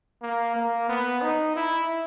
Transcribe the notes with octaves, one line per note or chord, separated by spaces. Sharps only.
A#3
A#3
B3
D#4
E4